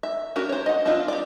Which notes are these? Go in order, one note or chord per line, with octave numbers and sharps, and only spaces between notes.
E5
C#4 D4 F#4 G4 A#4
C5 C#5
D#5 F#5
C4 D4 E4 F4 D#5
G4 D5